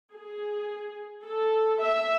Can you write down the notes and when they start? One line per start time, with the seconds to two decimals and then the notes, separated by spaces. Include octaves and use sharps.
0.13 G#4
1.24 A4
1.81 E5